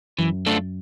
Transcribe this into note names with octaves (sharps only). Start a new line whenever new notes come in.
F#2 E3
A3 D4 F4 A4